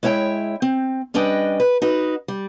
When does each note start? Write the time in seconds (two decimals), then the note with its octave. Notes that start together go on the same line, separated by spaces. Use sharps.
0.03 G#3 E4 C#5 E5 G5
0.62 C4
1.14 G3 C#4 D4 B4 D#5 G5
1.60 B4
1.82 D#4 F#4 B4
2.28 G3